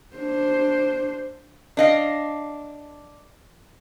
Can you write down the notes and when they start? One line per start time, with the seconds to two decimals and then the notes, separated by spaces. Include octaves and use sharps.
0.16 D4 C5
1.77 D4 D#5 F5